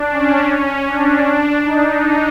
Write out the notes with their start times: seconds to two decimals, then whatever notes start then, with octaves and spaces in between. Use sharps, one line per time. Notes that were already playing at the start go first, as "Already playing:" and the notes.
Already playing: D4
0.11 C#4
0.88 D4
1.64 D#4